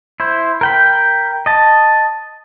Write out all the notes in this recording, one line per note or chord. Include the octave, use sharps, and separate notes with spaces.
E4 C5
A#4 G5 B5
D#5 A5